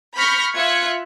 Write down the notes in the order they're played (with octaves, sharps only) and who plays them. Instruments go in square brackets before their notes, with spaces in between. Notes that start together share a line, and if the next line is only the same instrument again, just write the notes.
[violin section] B5 C#6 F6 G6 A#6
F4 E5 F#6 G#6 C#7